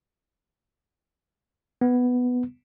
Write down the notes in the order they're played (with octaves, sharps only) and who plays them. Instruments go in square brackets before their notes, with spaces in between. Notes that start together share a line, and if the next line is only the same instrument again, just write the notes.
[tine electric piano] B3